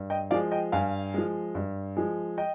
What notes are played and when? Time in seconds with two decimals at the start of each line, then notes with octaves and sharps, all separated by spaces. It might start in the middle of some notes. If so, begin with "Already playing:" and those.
Already playing: G2
0.10 D#5 G5
0.31 F3 G#3 D5 F5
0.51 D#5 G5
0.72 G2 F5 G#5
1.14 F3 G#3
1.55 G2
1.96 F3 G#3
2.38 D#5 G5